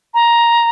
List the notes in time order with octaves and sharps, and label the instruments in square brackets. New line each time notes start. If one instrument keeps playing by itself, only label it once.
[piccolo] A#5